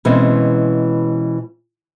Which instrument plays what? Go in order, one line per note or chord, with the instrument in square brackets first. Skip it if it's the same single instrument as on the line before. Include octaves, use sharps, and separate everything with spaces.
[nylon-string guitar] B2 E3 G#3 C4 C#4